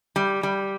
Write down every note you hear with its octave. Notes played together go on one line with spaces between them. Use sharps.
G3
G3